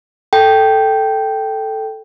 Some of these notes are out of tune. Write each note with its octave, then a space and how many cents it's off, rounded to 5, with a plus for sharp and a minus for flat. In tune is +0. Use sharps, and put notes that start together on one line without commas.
A4 +0 G5 -5